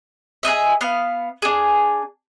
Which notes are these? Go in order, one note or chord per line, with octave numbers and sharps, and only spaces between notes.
G#4 A#4 D#5 E5
B3 F5
D4 G#4